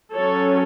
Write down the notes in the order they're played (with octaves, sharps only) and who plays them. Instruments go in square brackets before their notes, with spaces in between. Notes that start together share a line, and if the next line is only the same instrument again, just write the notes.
[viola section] F#3 C#4 A4 C#5